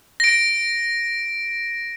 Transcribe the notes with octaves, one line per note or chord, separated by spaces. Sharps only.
A#6 D7